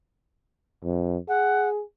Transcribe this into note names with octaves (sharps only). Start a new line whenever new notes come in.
F2
G#4 F#5